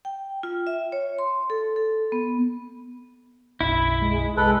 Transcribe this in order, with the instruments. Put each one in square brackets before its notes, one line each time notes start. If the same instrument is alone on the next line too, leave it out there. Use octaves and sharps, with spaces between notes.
[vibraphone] G5
F4
E5
C#5
C6
A4
A4
B3
[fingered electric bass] F#1 B1 [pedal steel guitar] E4
[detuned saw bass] G#3
[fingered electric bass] C2 [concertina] A4 B4